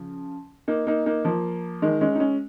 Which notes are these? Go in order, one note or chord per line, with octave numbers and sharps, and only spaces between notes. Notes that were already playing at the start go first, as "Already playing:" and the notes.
Already playing: C#3 F3
A#3 D#4
A#3 D#4
A#3 D#4
F3 A#3
D#3 G#3
G#3 C#4
D#4
G#3 C#4